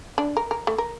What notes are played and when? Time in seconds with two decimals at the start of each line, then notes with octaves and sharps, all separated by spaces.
0.18 D4
0.37 A#4
0.51 A#4
0.67 A3
0.78 A#4